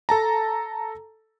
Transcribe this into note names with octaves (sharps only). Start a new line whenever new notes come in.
A4 A5 A#5